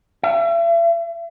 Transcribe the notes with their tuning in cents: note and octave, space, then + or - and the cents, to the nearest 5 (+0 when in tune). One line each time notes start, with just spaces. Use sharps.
E5 +40